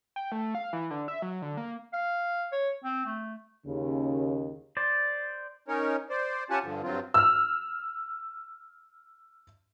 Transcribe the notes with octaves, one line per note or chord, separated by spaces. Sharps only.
G5
A3
F5
E3
D3
E5
F#3
D3
A#3
F5
C#5
C4
A3
D#2 C#3
C5 D5
C#4 D#4 A#4 C#5
C5 D5
C#4 F4 G4 F#5 G#5 A5
G2 D3 F3
G2 F#3 C4 F4
E6 F6